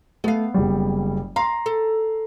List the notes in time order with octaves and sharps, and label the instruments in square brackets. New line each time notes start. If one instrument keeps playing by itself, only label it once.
[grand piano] A3 [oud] B3 F5
[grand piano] F#1 G3
[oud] F5 [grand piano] A#5 C6
[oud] A4